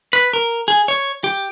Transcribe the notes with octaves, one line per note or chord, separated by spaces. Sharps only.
B4
A#4
G#4
C#5
G4